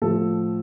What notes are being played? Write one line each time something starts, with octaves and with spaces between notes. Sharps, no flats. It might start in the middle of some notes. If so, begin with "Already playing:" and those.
A2 F3 A3 A4